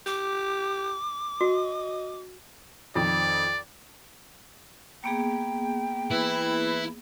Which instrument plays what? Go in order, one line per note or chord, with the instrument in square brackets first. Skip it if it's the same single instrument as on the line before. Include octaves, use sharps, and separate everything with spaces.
[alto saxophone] G4 [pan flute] D6
[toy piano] F#4 [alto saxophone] D#5
[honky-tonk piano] F2 D#3 [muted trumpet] D5
[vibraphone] A#3 B3 G#4 [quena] G5
[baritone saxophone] E3 [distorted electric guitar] E4